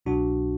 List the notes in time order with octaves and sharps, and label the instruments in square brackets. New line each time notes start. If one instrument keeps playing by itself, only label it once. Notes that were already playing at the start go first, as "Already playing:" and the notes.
[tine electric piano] C2 B2 F#3 D4 F#4